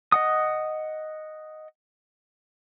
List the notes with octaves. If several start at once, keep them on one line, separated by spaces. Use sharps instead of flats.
D#5 F#5 D#6